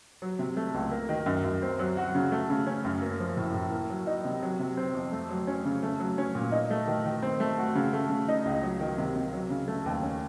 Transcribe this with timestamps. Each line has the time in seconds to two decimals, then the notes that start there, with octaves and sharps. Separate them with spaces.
0.22 F#3
0.39 C3
0.57 A3
0.74 C#2
0.91 A#3
1.09 D#3
1.26 F#2
1.44 F#2
1.62 C4
1.79 F#3
1.97 F#4
2.15 C#3
2.32 A3
2.50 C#3
2.66 C#4
2.84 F#2
3.02 A#3
3.20 F3
3.37 A2
3.54 A2
3.72 A#3
3.90 F#3
4.07 D#4
4.25 C3
4.42 F#3
4.59 C3
4.77 C4
4.95 F2
5.12 A3
5.30 F#3
5.47 C#4
5.65 C#3
5.83 A3
6.00 F#3
6.18 C#4
6.35 A#2
6.52 D#4
6.70 A3
6.88 D#3
7.05 D#3
7.22 C4
7.40 A3
7.58 F#4
7.75 C#3
7.93 A3
8.10 C#3
8.28 D#4
8.45 C#2
8.63 F#3
8.80 D#3
8.98 C3
9.16 C3
9.33 F#3
9.50 C#3
9.68 A3
9.86 D#2
10.03 C#4